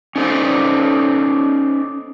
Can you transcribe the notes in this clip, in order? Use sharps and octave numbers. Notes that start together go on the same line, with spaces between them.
C#4 D#4 A4 C5 D5